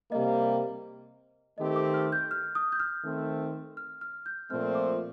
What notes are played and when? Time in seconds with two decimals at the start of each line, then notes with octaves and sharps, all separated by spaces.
0.11 C3 G3 A#3 D#5
1.58 D#3 A3 C4 G4 D#5
1.76 D6
1.94 F6
2.12 G6
2.31 F6
2.55 D#6
2.72 G6
2.80 F6
3.04 D#3 A3 C4
3.77 F6
4.01 F6
4.26 G6
4.50 A#2 F3 A3 C4 F6
4.75 D6